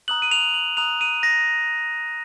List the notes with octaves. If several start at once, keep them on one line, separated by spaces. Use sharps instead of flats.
A#5 D#6 F#6 F#7
D#7
F7
F#7
A#5 D#6 F#6 F7
D#7
A#6